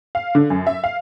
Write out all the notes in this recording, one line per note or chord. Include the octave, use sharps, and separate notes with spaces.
F5
D3
F#2
E5
F5